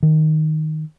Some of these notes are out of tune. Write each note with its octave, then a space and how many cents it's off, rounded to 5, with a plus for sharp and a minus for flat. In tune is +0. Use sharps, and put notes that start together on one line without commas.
D#3 +0